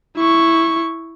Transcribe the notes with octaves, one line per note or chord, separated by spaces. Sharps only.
E4 C#6